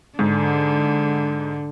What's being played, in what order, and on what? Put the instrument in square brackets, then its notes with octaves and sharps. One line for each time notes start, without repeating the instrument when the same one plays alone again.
[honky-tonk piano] G#2 [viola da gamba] D3